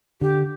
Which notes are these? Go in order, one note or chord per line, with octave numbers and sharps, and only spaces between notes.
D3 G4